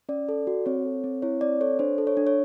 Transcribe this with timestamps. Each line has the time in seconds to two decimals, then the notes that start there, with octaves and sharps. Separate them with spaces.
0.09 C#4 D5
0.29 A4
0.47 F#4
0.66 C4 C#5
0.85 A4
1.04 C4
1.22 E4 C#5
1.41 C4 D5
1.61 A4 C#5
1.79 D4 C5
1.98 A4
2.07 C#5
2.17 D4
2.27 C#5